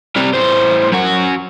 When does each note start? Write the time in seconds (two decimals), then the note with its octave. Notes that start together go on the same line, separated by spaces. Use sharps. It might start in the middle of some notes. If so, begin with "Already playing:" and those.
0.16 C3 G3
0.33 A2 C5
0.92 F#2 F#4